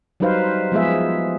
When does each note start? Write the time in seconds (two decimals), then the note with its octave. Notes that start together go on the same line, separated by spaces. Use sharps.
0.20 F#3 G3 D#4 B4 C5 F5
0.72 F3 G#3 B3 F4 G#4 E5